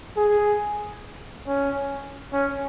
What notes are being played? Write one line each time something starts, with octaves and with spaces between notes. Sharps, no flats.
G#4
C#4
C#4